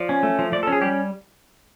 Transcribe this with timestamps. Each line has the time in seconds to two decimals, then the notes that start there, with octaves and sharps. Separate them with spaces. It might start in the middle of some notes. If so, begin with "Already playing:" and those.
Already playing: F3 D5
0.09 C#4
0.23 A3
0.39 F3
0.52 F3 D5
0.63 A4
0.67 C#4
0.72 G#4
0.81 G3 G4